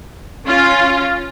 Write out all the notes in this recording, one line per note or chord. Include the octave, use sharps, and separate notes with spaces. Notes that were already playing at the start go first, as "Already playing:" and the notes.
C#4 F4